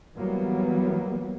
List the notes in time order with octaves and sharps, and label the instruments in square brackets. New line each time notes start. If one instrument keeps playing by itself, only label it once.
[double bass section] E3 F#3 G3 A#3 B3